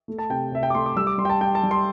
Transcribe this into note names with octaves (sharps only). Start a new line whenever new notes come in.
A3
A5
C3 G5
C3 E5
G5
D6
A3 C6
D6
G3 E6
D6
G3 C6
G5
A5
G3 G5
A5
G3
C6